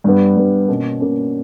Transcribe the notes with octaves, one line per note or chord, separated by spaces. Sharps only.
G2 G3 B3
G2 G3 B3
B2 A#3 C#4
B2 A#3 C#4